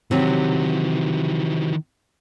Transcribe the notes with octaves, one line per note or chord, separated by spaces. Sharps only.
C3 D#3 E3 F#3 G4